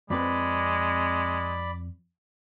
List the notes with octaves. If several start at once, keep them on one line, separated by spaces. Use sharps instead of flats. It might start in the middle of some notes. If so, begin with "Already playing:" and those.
F2 G#3 C4 B4 D5 B5